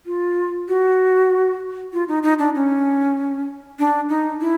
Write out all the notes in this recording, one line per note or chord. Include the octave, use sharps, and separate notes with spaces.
F4
F#4
F4
D#4
D#4
D4
C#4
D4
D#4
E4